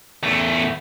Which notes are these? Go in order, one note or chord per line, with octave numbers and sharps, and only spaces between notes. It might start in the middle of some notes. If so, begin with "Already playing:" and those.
E2 A3